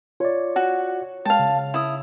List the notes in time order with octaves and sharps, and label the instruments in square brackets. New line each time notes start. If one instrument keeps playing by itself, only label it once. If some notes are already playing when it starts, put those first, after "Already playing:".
[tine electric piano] F4 D5 [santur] C#5
[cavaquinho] F#4
[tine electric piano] G#3 G5 [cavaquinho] F5 A5
[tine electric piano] C#3
[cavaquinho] E4 D#6